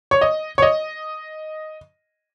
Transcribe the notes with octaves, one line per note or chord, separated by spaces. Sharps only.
C#5
D#5
C#5
D#5